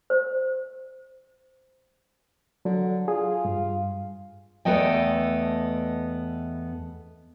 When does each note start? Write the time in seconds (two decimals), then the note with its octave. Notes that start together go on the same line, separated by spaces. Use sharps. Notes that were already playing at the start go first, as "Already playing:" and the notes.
0.10 C5
2.65 D3 F#3
3.08 F4 G#4
3.45 G2
4.65 E2 A3 B3 A4 D#5 G5